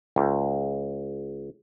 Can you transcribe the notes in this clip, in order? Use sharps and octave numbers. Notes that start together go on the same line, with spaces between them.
C#2